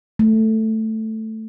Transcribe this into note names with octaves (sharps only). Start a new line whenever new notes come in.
A3